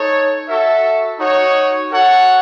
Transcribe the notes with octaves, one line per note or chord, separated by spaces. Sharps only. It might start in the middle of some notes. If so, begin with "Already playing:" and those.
Already playing: D#4 A4 C#5
F#4 A4 E5
D#4 F#4 C#5
F#4 A4 C#5 F#5